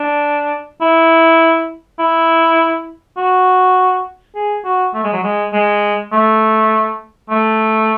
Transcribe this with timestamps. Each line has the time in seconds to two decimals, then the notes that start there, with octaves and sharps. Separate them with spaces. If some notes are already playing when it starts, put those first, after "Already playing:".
Already playing: D4
0.81 E4
1.99 E4
3.17 F#4
4.35 G#4
4.65 F#4
4.94 A3
5.04 G#3
5.13 F#3
5.23 G#3
5.53 G#3
6.12 A3
7.30 A3